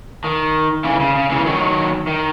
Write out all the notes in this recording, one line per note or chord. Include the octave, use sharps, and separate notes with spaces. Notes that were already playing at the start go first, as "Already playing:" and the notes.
D#3
C#3 E3
C#3
C#3
C#3 E3
D#3 F#3
D#3